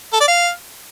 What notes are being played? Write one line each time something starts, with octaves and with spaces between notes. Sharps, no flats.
A4
D5
F5